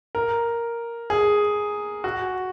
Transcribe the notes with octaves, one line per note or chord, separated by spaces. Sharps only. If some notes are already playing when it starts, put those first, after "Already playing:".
A#4
G#4
F#4